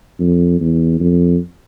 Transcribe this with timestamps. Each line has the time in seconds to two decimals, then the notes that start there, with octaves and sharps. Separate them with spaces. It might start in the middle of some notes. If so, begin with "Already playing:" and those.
0.20 F2
0.60 E2
1.00 F2